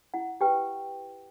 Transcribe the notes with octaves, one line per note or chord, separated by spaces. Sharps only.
E4 F#5
G4 B4 G5